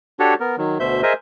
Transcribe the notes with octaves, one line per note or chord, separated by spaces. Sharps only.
D4 F#4 G4 A4 C#5
B3 A#4
D#3 F#3
D2 B2 C5 E5 G6
G#4 A#4 C5 D#5 E5